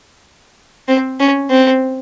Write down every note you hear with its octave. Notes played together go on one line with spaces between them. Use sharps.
C4
C#4
C4